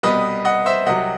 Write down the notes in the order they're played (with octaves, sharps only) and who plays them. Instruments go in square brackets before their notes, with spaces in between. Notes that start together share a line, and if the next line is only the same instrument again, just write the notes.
[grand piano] C2 B2 G3 B3 B4 D#5
D#5 F#5
C5 E5
C2 C3 F#3 D#5 F#5